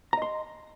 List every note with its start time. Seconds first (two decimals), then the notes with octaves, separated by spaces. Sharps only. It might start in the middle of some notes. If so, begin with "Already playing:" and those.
0.13 A#5
0.17 D#5
0.22 C6